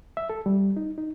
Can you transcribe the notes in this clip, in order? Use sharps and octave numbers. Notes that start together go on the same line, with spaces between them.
E5
A4
G3
D#4
D#4